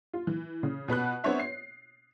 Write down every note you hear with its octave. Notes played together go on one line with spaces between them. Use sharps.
F4
E3
C#3
B2 B3 B5 F#6
B3 C4 D4 C#5 E5
C7